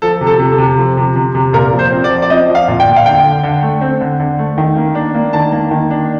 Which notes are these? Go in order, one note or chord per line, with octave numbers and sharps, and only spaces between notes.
F3 A4
C3
A4
C3
A4
C3
F3
C3
C3
C3
A#2 A#4
F3
C5
C4
D5
F3
D5
C4 D#5
F3
F5
A#2
G5
A#2
F5
D3 G5
D3
D3
A3
C4
D3
D3
A3
D#3
A#3
D4
A#3
D#3 A5
A#3
D#3
D4